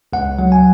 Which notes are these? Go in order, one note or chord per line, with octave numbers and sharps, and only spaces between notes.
C#2 F#5
F#3
G#5